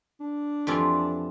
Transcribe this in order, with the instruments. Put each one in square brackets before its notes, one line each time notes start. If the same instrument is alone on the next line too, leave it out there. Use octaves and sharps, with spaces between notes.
[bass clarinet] D4
[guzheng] F2 E3 G3 C4 F4